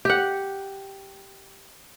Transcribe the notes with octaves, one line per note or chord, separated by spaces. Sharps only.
G4 F#5